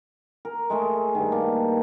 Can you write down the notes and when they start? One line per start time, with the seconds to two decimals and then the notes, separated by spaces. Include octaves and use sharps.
0.45 A#4
0.70 G#3 A3 G#4
1.15 G2 D#3
1.32 A#3 A5